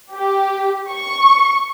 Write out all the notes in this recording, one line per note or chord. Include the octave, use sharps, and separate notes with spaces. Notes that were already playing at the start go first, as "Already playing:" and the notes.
G4
C#6